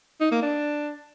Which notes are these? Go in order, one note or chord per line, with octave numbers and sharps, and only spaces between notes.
D#4
A#3
D4